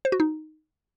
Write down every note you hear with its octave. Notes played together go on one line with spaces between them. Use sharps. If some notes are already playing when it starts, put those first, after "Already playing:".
C5
F#4
D#4